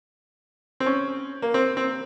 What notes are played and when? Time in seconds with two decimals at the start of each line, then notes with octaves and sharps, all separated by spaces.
0.80 C4
0.86 C#4
1.42 A#3
1.54 C4
1.77 C4